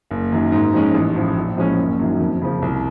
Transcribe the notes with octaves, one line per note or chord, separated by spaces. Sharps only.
F#1
F#2 D#3
G#2
F3 G#3 C#4
A1
A2 F3
A#1
A2 F3 G#3 C#4
F#1
F#2 D#3 F#3
F2
C#3 F3
C2